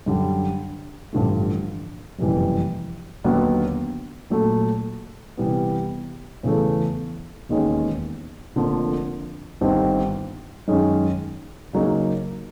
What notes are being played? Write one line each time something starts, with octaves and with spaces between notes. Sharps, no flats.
F#2 D3 G3
A1 G2 D3 F3 A3
F#1 F2 C3 E3 G3
D#2 D3 F#3 B3
A#2 F#3 A3
C3 E3 G3 B3
E2 C#3 E3 A3
E1 D#2 D#3 G#3 C#4
F1 F2 D3 F3 A#3
G1 G2 D#3 G3 C4
F#2 D#3 G#3 C#4
C#3 F#3 A#3 D#4 G#4